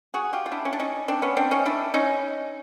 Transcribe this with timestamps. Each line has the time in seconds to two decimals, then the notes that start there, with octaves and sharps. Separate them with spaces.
0.14 F#4 G#4
0.33 F4 G4
0.46 F4
0.52 D4 E4
0.65 C#4
0.73 D4
0.80 C#4 D#4
1.08 C4 D4
1.22 B3 C#4
1.37 C4 D4
1.51 C#4 D#4
1.65 D4 E4
1.94 C#4 D#4